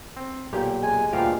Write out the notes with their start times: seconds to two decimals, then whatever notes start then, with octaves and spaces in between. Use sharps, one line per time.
0.17 C4
0.53 B1 A#2 G4 G#4 G5
0.83 G#3 D#5 G#5
1.13 D2 G2 A#2 F4 F5 G5